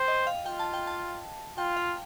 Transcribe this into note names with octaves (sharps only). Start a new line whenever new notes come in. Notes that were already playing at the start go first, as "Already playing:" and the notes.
Already playing: C5 G5
D#5
F5
F4 G5
A5
G5
A5
F4 G5
F5